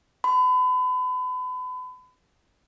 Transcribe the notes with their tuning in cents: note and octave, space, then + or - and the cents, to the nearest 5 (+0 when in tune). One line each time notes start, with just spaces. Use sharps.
B5 +35